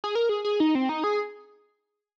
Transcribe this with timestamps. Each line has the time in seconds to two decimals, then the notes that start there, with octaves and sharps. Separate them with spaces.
0.04 G#4
0.15 A#4
0.29 G#4
0.45 G#4
0.60 D#4
0.75 C4
0.89 D#4
1.04 G#4